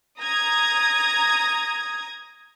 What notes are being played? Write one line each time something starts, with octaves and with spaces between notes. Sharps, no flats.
A#5 D#6 G#6